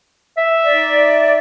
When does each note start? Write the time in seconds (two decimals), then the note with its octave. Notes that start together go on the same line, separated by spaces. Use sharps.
0.37 E5
0.65 D#4 D5